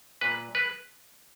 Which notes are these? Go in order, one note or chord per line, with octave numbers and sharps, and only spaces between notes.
A#2 B4
B4